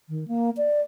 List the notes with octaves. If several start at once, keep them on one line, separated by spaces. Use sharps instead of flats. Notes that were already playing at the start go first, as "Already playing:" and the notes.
D#3
A#3
D5